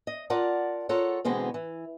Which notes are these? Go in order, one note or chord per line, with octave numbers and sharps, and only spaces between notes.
D#5
F4 A#4 D5 F#5 A5
F4 A4 A#4 C#5 F#5
B2 D3 E3 G#3 B3 C4
E3